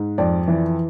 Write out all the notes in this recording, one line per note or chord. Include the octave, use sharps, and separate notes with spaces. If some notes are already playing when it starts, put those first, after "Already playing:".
Already playing: G#2
F2 D5
E3